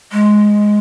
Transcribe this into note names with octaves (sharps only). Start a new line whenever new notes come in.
G#3